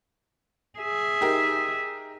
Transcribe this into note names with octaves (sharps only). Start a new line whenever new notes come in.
G#4 E5
D#4 G4 A#4